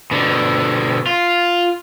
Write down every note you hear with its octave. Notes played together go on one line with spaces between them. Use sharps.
B2 D3
F4